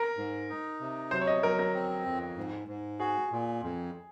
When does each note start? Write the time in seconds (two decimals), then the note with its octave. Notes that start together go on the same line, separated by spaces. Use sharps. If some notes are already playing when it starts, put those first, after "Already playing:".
Already playing: A#4
0.17 G#2
0.49 D#4
0.80 C3
1.11 F#3 C5
1.21 C#5
1.27 D#5
1.43 F#3 A#4
1.59 A#4
1.74 C4
2.06 F2
2.38 G#2
2.68 G#2
2.99 F#4 G#4
3.32 A#2
3.63 F2